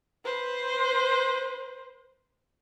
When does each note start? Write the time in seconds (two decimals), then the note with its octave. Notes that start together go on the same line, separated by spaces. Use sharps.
0.25 B4 C5